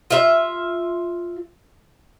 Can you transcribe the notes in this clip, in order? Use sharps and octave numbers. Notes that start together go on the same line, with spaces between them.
F4 E5